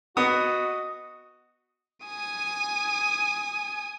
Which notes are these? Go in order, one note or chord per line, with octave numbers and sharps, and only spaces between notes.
B3 F#4 D#5 D#6
G#5 D#6